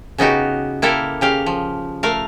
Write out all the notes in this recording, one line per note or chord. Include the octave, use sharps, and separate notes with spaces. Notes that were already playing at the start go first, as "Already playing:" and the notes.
C#3 B3 D#4 F#4 G4
A#3 E4 G4 A4 F5
C#3 G4 F5
F3
A3 A#4 F5